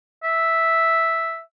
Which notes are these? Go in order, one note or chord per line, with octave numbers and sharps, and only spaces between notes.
E5